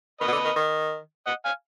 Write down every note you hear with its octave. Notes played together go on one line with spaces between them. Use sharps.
D#3 B4 D#5
B2
D3
D#3
D#3
D#5 F#5
F5 G#5